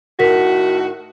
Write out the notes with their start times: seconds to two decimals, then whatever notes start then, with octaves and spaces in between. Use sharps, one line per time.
0.20 A2 D#3 F#4 A#4 B6